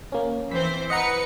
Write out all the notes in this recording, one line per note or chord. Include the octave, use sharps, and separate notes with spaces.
A#3 C#4
E3 C4 C5 B6
B4 D#5 F#5 A#5 C#7